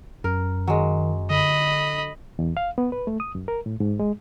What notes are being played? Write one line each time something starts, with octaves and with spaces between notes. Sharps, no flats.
F#2 A#4
D#3 F#3 G#3
D3 D#5 B5
E2
F5
B3
B4
A3
D#6
F#2
A#4
A2
G#2
G#3